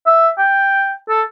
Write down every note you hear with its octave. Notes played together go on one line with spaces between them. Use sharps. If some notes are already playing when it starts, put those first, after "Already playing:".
E5
G5
A4